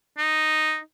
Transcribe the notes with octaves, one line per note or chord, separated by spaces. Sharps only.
D#4